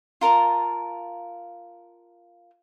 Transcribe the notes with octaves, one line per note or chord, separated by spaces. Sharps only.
F4 A#4 A5 A#5